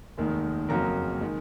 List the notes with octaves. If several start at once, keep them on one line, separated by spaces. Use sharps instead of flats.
F1 D#2 D#3 G#3
F#1 F2 C#3 F#3 A#3 A#4 A#5
D#3 G#3